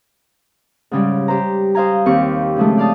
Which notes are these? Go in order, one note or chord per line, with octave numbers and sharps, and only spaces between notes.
G#2 C#3 G3
G4 C5 A#5
C5 D#5 F5 G#5 A#5
D#2 C4 G4 C#6
C#3 F3 G#3 A3
D5 F5 A5 D#6